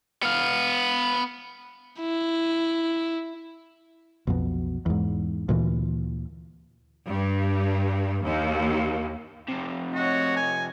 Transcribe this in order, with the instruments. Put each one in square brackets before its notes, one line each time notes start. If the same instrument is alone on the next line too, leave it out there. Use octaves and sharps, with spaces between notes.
[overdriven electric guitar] B3 F5
[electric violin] E4
[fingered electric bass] B1 F2 B2
E2 G#2
D2 A#2 E3
[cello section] G2
D#2
[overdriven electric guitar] F2 C3
[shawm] F#4 [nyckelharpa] C#5 D#5
[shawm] G#5